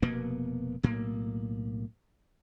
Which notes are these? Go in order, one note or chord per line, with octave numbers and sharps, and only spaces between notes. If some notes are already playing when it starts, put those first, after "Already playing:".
F1 B2 A#3 B3
B1 A2 A#3